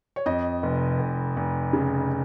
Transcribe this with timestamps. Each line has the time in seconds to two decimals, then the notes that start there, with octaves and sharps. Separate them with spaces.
0.16 C#5
0.26 F2 D#5
0.63 F1
0.99 F1
1.37 F1
1.73 C#3